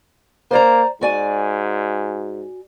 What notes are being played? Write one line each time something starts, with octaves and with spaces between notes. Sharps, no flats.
A#3 C5 D5 A#5
G#2 F#4 D5 G#5